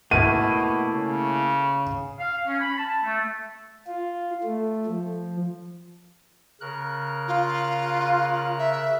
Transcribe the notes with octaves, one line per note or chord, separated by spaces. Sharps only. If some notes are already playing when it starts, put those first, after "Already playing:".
B2 A3 A#3 E4 D#7
C#3
F5
C#4
B5
A5
A3
F4
A3
F3
C#3 A#4 F#6
F4
E5